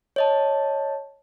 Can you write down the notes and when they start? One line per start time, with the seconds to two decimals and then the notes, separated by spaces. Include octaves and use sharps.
0.16 C#5 D#5 A5